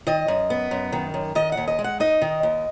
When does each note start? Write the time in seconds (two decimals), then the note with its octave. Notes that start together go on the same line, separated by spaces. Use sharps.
0.07 D#3 D#5
0.28 F#2
0.50 B3
0.71 F#2
0.92 D#3
1.14 F#2
1.35 D#3 D#5
1.52 F#5
1.57 D#2
1.68 D#5
1.79 G#3
1.84 F#5
2.00 D#4 D#5
2.22 D#3
2.43 D#2